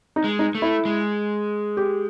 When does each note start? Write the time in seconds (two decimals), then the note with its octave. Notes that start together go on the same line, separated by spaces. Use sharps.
0.16 D#4
0.24 G#3
0.39 D#4
0.55 A3
0.62 E4
0.85 G#3
1.77 G4